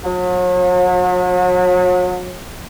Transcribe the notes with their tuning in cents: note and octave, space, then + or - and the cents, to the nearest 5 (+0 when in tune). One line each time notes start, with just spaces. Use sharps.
F#3 -40